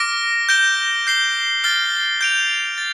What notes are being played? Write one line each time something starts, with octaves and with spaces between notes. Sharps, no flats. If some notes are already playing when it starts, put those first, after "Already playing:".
Already playing: D6 F6 A#6 D7
G6 A#6 D7 G7
G6 C7 G7
F6 A6 C7 G7
G6 D7 F7
A6